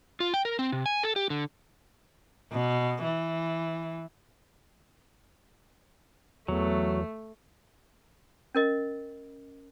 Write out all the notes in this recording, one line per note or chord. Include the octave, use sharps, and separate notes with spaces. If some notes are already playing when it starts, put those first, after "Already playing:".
F4
G5
A#4
C4
C3
G#5
A4
G4
D3
B2
E3
E2 F#3 A3
C#4 A#4 D#5